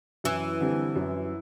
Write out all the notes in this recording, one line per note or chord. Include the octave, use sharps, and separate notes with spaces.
F#2 E3
D3 G3 C4
F#2